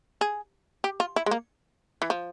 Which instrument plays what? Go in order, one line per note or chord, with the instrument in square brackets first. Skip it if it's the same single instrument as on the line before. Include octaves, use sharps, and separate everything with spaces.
[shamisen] G#4
G4
F4
E4
G#3
A#3
E3
F3